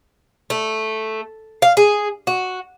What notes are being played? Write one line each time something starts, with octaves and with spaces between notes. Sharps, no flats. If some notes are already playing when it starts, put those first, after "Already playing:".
A3
F5
G#4
F#4